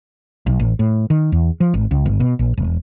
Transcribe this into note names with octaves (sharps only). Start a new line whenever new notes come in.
B1
A1
A2
D#3
E2
F3
G#1
C#2
G1
B2
A#1
E1